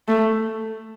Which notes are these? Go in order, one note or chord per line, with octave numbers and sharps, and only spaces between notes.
A3